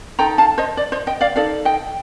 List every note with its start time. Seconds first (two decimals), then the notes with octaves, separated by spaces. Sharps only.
0.19 D#4 A4 G5 A#5
0.38 F5 A5
0.58 C5 D#5
0.77 D5
0.92 C5 D#5
1.07 D#5 G5
1.21 D5 F5
1.36 D#4 A4 D5 F5
1.65 D#5 G5